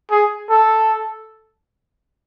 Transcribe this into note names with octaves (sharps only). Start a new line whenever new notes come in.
G#4
A4